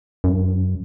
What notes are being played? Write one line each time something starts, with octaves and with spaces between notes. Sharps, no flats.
F#2